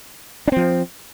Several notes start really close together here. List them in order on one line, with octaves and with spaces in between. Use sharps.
D4 C4 F3